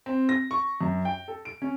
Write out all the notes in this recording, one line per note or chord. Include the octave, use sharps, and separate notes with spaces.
C4
A#6
C#6
F#2
G5
A4
D7
C#4